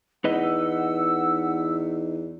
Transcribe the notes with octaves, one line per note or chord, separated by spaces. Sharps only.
E2 D#4 B4 D#5 F#5 E6